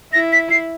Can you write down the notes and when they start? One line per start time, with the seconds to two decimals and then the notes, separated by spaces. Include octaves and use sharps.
0.13 E4 A#6
0.32 B6
0.51 C7